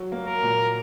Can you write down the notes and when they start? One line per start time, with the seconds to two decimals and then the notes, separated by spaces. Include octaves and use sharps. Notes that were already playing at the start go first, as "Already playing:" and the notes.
Already playing: F#3
0.12 A#3
0.27 A#4
0.43 A#2